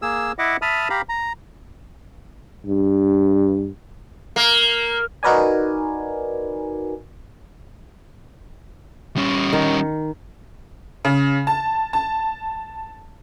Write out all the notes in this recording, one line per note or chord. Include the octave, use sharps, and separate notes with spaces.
A#3 G#4 E6
E4 D#5 E5 F#5 D6
E5 A5 B5 D#6 F6
G4 F5 A#5 B5
A#5
G2
A#3
D#4 F#4 A#4 B4 D5 G#5
G3 C#4
D#3
C#3
A5
A5